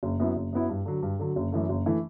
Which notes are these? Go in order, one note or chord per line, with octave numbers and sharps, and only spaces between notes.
F#1
F#2 F#3 B3 E4
F#1
F#2 F#3 B3 E4
G2
D3 F#3
G2
D3 F#3
F#1
F#2 E3 A3
F#1
E3 A3